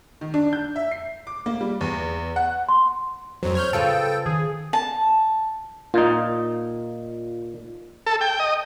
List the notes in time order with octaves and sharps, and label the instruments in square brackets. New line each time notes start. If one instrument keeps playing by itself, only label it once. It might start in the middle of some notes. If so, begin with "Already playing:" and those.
[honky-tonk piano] D#3
D4
G6
E5
C7
D6
A#3
G3
E2
F#5
[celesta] C6
[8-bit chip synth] F2 F#3 [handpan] C5
[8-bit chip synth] C#5 F6 G6
[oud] C#3 F4 B4 [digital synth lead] A4 [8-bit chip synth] G5
[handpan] D#3 [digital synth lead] G#4
[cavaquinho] A5
[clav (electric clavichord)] A#2 D#4 [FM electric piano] F4
[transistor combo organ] A4
G5
D#5